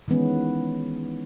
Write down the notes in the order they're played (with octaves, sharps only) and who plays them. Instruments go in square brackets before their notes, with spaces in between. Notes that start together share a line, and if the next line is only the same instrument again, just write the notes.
[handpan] D#3 E3 G#3 B3 C#4